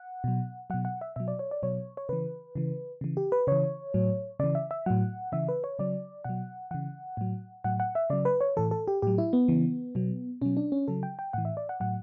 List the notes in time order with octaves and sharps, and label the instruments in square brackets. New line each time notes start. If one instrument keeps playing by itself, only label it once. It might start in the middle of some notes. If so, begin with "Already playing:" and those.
Already playing: [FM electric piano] F#5
B2 F#3
B2 F#3 F#5
F#5
E5
B2 F#3 E5
D5
C#5
D5
B2 F#3 C#5
C#5
C#3 E3 B4
C#3 E3
C#3 E3
G4
B4
C#3 E3 C#5
A2 F#3
C#3 E3 D5
E5
E5
A2 F#3 F#5
C#3 E3 E5
B4
C#5
C#3 F#3 D5
B2 F#3 F#5
C#3 E3 F#5
A2 F#3
A2 F#3 F#5
F#5
E5
C#3 F#3 D5
B4
C#5
A2 E3 A4
A4
G4
A2 F#3 G4
E4
B3
C#3 E3
B2 F#3
B2 F#3 C#4
D4
C#4
C#3 F#3 A4
G5
G5
A2 E3 F#5
E5
D5
F#5
A2 F#3 F#5